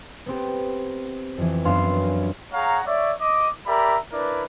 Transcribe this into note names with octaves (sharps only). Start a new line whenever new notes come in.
B3 C4 G4
F2 E3
F#2 B3 D4 F5 C6
G#4 C#5 F5 F#5 A#5
C#5 D5 E5
D#5 D6
G4 A#4 D5 E5 A#5 B5
D4 E4 A#4 B4 D5